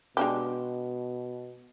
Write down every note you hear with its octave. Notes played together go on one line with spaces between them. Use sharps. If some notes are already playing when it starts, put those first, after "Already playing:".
B2 G#3 D4 G4